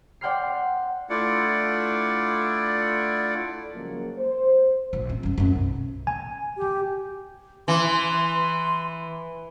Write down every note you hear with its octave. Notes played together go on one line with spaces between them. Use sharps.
D5 F#5 G5 C6 F6 C7
A3 D4 E4 F4 D5 F#5
C#3 F3 F#3 G#3 A#3
C5
A#1
C4
F#2 G#3
F#2 C4
B1
G#5
G4
E3 C6